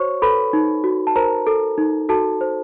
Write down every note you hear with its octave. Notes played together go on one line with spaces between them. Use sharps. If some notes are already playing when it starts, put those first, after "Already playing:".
Already playing: F#4 C5 C#5 C#6
A4 B4 B5
D#4
F#4
A5
A#4 C5 A#5
A4
D#4
F#4 A4 A5
C5